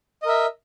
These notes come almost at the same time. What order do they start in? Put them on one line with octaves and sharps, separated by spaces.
D#5 A#4 E5